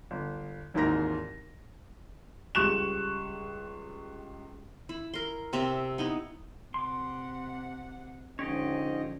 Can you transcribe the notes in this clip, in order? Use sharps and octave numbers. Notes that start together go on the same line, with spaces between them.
G1
G#1 D#2 G#2 E3 A#4 A#6
C#2 G3 C#6 F#6 E7
E4
A#4 C6
C3 C4 E5 A#5
B3 D#4 E4
C3 F#5 C6 D6
G#2 D3 F3 C#4 G4 C#5 D#5